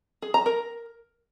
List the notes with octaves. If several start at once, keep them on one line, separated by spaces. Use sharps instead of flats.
G#4
A#5
A#4